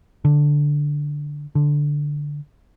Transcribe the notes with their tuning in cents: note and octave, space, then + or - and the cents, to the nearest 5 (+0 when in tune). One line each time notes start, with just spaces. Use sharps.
D3 +0
D3 +0